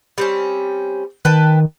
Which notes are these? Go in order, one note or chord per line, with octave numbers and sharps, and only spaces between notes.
G3 C4 C#4
D#3 B4 G5 A5